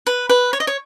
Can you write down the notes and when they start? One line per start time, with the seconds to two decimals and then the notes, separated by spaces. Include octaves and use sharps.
0.07 B4
0.29 B4
0.53 C#5
0.60 D#5
0.67 C#5